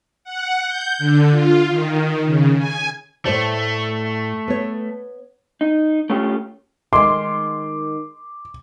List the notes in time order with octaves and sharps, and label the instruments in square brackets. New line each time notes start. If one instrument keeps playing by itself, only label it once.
[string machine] F#5
G6
D3
F4
D#3
C#3
G#5
[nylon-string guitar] A2 C5 D5 [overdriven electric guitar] A3
[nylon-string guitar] B3 C#5
[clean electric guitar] D#4
A3 C#4 F4 G4
[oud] D#3 G#3 [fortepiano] C6 [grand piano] D6